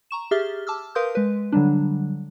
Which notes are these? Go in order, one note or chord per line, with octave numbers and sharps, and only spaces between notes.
A#5 C#6 E7
G4 G#4 E5 F6 A6 G7
A5 D6 E6 F6
A#4 B4 F5 C6 D#6 G6
G#3 B4
D3 F#3 G3 D4